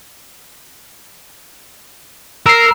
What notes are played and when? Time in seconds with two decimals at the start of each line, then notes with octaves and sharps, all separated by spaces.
2.46 A#4 E6 C7